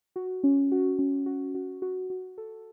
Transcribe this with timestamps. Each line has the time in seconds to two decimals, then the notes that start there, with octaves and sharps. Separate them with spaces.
0.16 F#4
0.44 C#4
0.72 F#4
0.99 C#4
1.26 F#4
1.55 F#4
1.82 F#4
2.10 F#4
2.38 A4